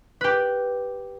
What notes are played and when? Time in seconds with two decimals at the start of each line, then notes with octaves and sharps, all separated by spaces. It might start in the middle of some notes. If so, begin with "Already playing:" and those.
0.21 G4 B4